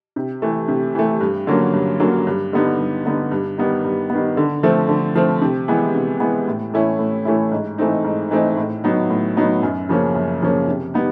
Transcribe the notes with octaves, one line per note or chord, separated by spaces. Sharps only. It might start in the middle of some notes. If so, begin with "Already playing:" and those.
C3
E3 A3
C3
E3 A3
G2
D3 F#3 A#3 C#4
G2
D3 F#3 A#3 C#4
G2
D3 G3 B3 D#4
G2
D3 G3 B3 D#4
G2
D#3 G3 B3
G2
D#3 G3 B3
D3
F3 A3 C4
D3
F3 A3 C4
C3
E3 G#3 B3
C3
E3 G#3 B3
A2
E3 A3 C#4 E4
A2
E3 A3 C#4 E4
G#2
E3 A3 C4 D#4
G#2
E3 A3 C4 D#4
A2
F#3 B3 D#4
A2
F#3 B3 D#4
F#2
C#3 F3 A#3 C#4
F#2
C#3 F3 A#3 C#4
C3
G3 B3 D#4